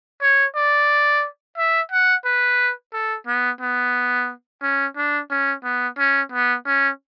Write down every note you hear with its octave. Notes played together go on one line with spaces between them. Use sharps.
C#5
D5
E5
F#5
B4
A4
B3
B3
C#4
D4
C#4
B3
C#4
B3
C#4